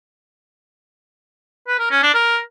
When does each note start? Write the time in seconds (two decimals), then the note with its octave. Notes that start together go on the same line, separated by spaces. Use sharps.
1.68 B4
1.79 A#4
1.91 C#4
2.03 D4
2.14 A#4